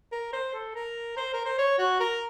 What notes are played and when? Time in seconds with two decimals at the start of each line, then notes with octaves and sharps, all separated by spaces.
0.12 A#4
0.33 C5
0.54 A4
0.75 A#4
1.17 C5
1.33 A#4
1.45 C5
1.59 C#5
1.78 F#4
2.00 A#4